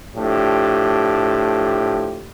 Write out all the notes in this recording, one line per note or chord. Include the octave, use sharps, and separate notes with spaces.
A2 F3 D4 G4